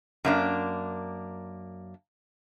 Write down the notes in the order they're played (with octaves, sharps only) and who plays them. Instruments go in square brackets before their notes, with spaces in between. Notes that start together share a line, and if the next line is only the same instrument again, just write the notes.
[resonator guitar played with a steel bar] F#2 A#3 D4